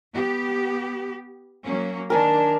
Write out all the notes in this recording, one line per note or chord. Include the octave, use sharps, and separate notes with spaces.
B3 G4
F#3 A#3 C#4
D#3 D4 A#4 G#5 A5